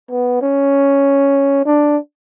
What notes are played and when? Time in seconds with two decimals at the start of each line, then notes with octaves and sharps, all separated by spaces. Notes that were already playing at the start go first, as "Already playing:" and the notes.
0.11 B3
0.42 C#4
1.65 D4